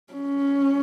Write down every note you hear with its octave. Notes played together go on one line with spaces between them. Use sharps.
C#4